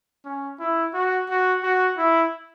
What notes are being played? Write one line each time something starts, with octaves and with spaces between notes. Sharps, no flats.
C#4
E4
F#4
F#4
F#4
E4